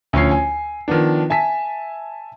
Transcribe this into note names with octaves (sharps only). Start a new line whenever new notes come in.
D2 F3 C#4 C#5 C7
G#5
D#3 F3 B3 D4
E5 G#5 A5 B6